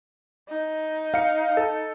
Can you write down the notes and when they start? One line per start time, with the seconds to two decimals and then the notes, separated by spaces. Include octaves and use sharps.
0.49 D#4
1.14 F5 C#7
1.57 A4